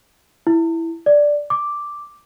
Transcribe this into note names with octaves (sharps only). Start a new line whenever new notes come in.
E4
D5
D6